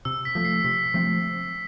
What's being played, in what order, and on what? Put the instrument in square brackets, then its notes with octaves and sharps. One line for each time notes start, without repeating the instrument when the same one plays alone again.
[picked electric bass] C3 [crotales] E6
[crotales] B6
[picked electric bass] F3 A3
[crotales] C7
[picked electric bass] C3 [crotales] B6
[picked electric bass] F3 A3 C4